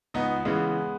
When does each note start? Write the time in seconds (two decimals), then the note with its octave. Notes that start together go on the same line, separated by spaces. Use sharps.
0.14 C#2 B3 D#4
0.45 C#3 E3 G#3 B3